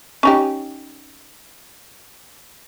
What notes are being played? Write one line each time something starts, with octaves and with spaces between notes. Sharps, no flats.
C#4 D#4 G4